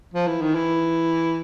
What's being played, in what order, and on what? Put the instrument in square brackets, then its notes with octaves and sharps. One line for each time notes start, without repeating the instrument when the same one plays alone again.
[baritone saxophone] F3
E3
D#3
E3